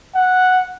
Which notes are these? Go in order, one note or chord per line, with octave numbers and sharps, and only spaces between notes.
F#5